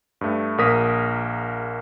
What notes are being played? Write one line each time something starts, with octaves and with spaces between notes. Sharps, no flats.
G2 A3
A#1 A#3 A#4 D#6 B6